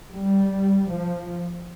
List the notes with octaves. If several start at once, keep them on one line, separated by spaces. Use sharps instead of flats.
G3
F3